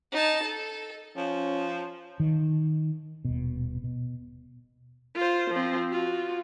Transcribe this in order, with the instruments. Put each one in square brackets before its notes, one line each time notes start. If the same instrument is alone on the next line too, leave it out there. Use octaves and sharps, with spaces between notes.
[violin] D#4 A5
A4
[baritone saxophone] F3 [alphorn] C#4
[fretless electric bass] D#3
D#1 B2
B2
[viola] F4 C5
F3 C4
F4 F#4